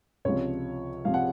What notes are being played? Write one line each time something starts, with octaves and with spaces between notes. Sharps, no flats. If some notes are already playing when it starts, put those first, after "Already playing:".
C#2 C3 F3 C#5
C3 F3 F5
F#5